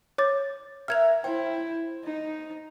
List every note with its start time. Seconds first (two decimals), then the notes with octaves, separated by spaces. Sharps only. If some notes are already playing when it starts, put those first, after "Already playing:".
0.18 C#5 D6 A6
0.88 A#4 E5 F#5 F6 G#6 F7
1.24 E4 C5 G5
2.04 D#4